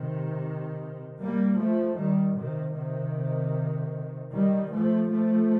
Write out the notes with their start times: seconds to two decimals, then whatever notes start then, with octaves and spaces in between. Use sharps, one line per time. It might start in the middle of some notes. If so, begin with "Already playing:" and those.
Already playing: C3 D#3
1.19 G3 A#3
1.58 F3 A3
1.97 D#3 G3
2.36 C3 D#3
2.76 C3 D#3
4.32 D#3 G3
4.71 F3 A3
5.10 F3 A3